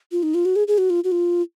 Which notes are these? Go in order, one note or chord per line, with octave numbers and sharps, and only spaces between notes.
F4
D#4
F4
F#4
G#4
G#4
F#4
F4
F#4
F4